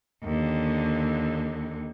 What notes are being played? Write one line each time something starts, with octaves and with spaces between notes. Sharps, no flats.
D#2 D3